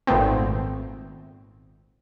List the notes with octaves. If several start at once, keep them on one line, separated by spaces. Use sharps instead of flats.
G#1 A#2 A3 B3 C4